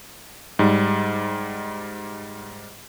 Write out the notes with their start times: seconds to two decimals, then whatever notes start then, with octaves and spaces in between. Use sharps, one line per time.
0.59 G#2 G3